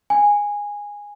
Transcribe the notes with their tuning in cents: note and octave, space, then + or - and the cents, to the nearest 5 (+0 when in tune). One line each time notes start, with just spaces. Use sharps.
G#5 -15